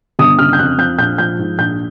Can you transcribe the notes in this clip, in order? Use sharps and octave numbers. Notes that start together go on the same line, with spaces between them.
G1 D#6
C#3 F6
G6
F2 F#6
F3 G6
A#1 G6
F3 G6
G#2
A#1 G6